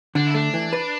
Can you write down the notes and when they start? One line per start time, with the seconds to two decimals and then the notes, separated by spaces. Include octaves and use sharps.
0.15 D3 D4
0.27 E4
0.34 A3 D4
0.54 E3
0.73 B4